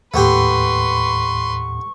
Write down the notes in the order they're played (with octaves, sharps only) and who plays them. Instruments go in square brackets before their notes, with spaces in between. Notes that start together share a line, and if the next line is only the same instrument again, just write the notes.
[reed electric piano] D#2 A2 [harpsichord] A3 B3 G4 [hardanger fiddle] B4 C6 [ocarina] C#6